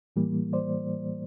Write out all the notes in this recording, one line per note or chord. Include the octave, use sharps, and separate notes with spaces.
A2 E3 G3 A#3
C5 D5